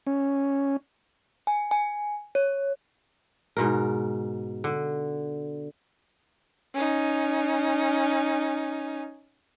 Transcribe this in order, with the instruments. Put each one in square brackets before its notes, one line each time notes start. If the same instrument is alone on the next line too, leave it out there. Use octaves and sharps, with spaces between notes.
[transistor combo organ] C#4
[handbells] G#5
G#5
C#5
[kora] G#2 B2 A#4
D3
[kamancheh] C#4 D#4